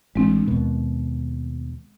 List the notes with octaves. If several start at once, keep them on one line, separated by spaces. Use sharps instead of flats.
A1 G#3 C4 D4
D#2 B2